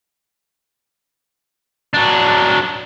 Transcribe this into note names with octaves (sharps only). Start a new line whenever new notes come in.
F#3 D4